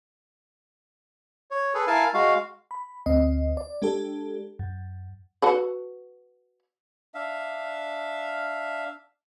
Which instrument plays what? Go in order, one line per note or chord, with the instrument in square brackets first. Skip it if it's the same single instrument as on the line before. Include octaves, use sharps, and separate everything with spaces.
[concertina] C#5
G#4 A4 B4
E4 A#4 F5 G#5 A5
G#3 F#4 F5
[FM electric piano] B5
D2 C4 D#5
D5
G#3 D4 G4 A4
F#2
[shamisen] F#4 A4 B4
[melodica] D4 E5 F5